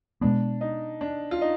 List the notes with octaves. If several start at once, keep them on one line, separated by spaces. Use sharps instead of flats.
B2 G#3 B3 D4
D#4
D4
F4
D#4